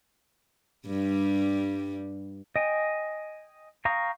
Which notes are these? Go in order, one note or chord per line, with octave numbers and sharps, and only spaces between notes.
G2 G3
D#5 G5 G#5
F5 G5 A#5 C#6 D#6